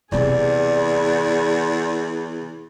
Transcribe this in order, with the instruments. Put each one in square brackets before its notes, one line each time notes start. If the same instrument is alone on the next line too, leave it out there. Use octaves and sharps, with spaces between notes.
[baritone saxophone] E2 [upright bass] C3 C4 [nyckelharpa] G#4 [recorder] D5